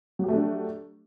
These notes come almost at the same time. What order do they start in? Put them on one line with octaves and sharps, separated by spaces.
F#3 G4 A3 D4